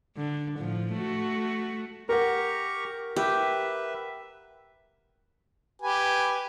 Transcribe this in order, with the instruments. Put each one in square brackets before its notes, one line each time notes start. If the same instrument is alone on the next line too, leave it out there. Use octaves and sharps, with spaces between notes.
[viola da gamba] D3
A2 F3
A3 F#4
[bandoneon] G4 A#5 C#6 [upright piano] A#4 F#5
[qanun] G4 [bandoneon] B4 E5
[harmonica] G4 B4 G#5